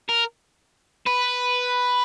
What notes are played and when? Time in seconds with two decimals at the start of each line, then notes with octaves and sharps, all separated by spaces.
0.09 A#4
1.06 B4